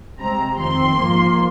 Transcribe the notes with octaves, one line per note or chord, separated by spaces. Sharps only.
C3 G#3 C4 A#5
F2 D#3 C4 C6
G#2 F3 A#3